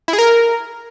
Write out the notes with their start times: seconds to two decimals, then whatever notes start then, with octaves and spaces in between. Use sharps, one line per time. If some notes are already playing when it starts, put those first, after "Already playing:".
0.08 E4
0.13 G#4
0.19 A#4